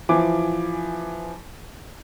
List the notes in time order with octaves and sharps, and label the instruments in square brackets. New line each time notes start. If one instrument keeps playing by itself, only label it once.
[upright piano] E3 F3 G#5 D6